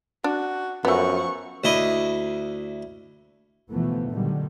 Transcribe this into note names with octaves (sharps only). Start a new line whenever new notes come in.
D4 F#4
F#2 F3 A3 B3 F#5 C#6
D2 E4 D#5
D2 B2 E3 F3 A3 B3
A#2 D3 D#3 F#3 G3